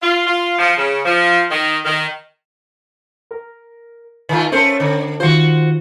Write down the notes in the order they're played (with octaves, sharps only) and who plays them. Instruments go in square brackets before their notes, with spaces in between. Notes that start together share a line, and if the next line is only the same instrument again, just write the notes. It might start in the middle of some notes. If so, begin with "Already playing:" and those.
[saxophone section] F4
F4
F3
C#3
F3
D#3
D#3
[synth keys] A#4
[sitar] D#3 A3 F4
[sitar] A3 C5 [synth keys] C#4 A#4 C#5
[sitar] D3
[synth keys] D#3 F4 [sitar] F#4 C5